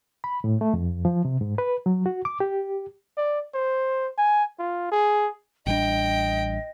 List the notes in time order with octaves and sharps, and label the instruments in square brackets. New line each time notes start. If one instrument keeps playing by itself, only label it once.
[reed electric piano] B5
A2
A3
F2
F3
C3
G#2
B4
F#3
F#4
D6
G4
[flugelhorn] D5
C5
G#5
F4
G#4
[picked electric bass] A1 G3 D4 [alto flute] D#5 [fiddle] G5